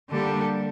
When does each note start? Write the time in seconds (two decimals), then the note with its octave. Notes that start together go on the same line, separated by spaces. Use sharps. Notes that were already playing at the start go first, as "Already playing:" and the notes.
0.10 D3 G3 A#3 D4 G4 A4